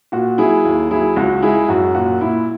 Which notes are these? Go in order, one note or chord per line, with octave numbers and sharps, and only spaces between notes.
A#2 F#4
F#3 E4 G#4
D#2
F#3 E4 G#4
C#2 F#4
G#3 E4 G#4
F#2 F#4
A#2 F#4
A#2 E4